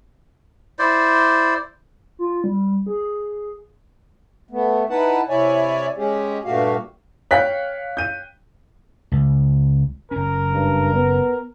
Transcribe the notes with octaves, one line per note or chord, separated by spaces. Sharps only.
E4 C5 D5
F4
G3
G#4
A3 B3
D#4 E4 B4 F#5 A5
C3 E4 C#5 D5 E5 G#5
G#3 C#4 G4 G#4
G2 A#2 A3 F#4 G4 F5
C#5 F5 G5 F#6 B6
G6 D#7
C#2
F#1 C#4 A#4
G2
B3